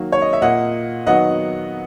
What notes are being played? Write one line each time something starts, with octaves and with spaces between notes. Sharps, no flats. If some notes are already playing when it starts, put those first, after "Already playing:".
Already playing: D#3 F#3 A#3
C#5
D#5
E5
A#2 A#3 D#5 F#5
D#3 F#3 B3 D#5 F#5